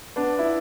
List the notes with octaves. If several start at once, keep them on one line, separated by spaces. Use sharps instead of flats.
B3 D4
E4